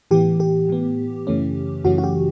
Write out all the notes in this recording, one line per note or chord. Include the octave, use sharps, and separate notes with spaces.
A2 E3 B3 G4
G4
A2 E3 B3
F#2 C#3 E3 A3 C#4
F#2 C#3 E3 A3 C#4 F#4
F#4
G4